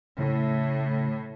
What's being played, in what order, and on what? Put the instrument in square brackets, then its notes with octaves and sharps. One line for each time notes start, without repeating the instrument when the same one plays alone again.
[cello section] A2 [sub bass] C#3